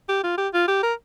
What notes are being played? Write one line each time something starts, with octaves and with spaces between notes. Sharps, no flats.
G4
F4
G4
F4
G4
A#4